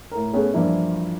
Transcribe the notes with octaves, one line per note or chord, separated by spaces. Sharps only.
A2 A#4
A3 B3 C#4 G#4
G2 E3 F3 A#3 D4 E4